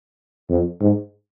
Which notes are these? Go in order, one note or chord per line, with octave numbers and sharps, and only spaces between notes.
F2
G#2